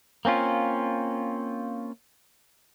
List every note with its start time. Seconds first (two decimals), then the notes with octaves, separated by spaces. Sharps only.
0.25 A#3 C4 C#4 F4